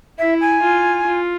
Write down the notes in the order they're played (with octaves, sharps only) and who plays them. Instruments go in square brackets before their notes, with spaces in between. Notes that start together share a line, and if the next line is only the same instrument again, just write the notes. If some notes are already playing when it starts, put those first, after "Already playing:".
[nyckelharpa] E4 [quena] E5
[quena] G#5
[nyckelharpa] F4
F4